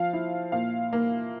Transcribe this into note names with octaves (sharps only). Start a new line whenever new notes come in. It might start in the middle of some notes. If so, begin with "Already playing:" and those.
Already playing: F3 F5
E4
A#2 F5
A#3